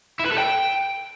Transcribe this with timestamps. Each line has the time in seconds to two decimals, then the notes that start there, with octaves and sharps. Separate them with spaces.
0.20 E4
0.26 B4
0.32 A4
0.38 G5